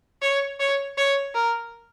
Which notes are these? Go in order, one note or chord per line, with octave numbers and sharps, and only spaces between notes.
C#5
C#5
C#5
A#4